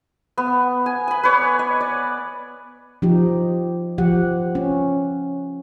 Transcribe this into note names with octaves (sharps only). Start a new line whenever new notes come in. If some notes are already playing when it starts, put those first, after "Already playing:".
B3
G#5
G#5 B5
B4 C#5 D5
D#5
D5
F3 D#4 G4
F3 G4 F#5
C#4